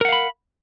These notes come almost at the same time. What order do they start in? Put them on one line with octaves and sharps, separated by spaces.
A#4 F#5 F5 B5